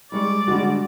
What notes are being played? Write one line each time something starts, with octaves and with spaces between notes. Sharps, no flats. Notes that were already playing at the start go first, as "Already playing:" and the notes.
G3 G#3 D5 C#6
D3 G3 G#3 F#4